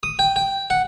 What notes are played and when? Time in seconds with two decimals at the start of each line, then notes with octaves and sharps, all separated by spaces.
0.03 D#6
0.19 G5
0.36 G5
0.70 F#5